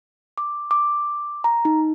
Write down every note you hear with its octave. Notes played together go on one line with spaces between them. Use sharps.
D6
D6
A#5
D#4